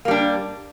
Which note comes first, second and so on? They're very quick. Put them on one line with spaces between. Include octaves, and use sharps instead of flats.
A#3 G3 D4